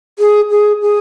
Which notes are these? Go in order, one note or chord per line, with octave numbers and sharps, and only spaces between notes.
G#4
G#4
G#4